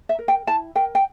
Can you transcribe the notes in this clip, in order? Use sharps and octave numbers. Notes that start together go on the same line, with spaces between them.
E5
A#4
G5
E4 A5
A#4 G5
G5